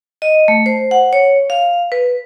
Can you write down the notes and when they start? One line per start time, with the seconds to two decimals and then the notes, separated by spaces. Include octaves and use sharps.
0.22 D#5
0.48 A3
0.66 C5
0.91 F#5
1.13 C#5
1.50 F5
1.92 B4